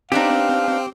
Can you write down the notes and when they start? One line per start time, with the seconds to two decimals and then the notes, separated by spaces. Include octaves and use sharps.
0.12 B3 C4 D4 D#4 G4 F5